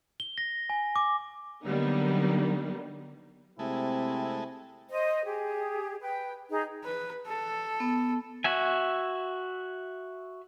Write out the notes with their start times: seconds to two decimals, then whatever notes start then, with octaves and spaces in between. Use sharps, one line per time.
0.20 G7
0.38 A#6
0.70 G#5
0.96 D6
1.65 D3 F#3 G3 A#3 B3 D#4
3.59 C3 G#3 A3 C4 E4
4.90 C5 D#5
5.24 G4 G#4
6.01 B4 G5
6.50 D#4 G#4
6.84 B4
7.27 A4
7.80 B3
8.44 F#4 E5 G#5